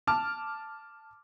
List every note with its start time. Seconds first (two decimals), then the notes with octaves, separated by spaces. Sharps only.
0.07 A5 D6 F6